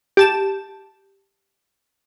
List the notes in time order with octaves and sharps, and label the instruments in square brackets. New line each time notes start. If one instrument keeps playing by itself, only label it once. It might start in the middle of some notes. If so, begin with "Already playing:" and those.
[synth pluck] G4 A5 E7